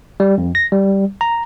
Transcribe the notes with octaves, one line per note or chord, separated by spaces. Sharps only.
G3
F2
A#6
G3
A#5